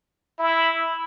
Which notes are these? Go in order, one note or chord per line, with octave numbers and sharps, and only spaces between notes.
E4